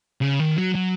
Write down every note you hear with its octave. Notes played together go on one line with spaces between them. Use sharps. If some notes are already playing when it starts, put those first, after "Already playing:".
C#3
D#3
F#3
F#3